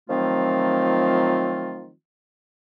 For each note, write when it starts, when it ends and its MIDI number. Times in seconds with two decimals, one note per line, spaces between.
0.10 1.91 51
0.10 1.91 53
0.10 1.91 54
0.10 1.91 57
0.10 1.91 60
0.10 1.91 65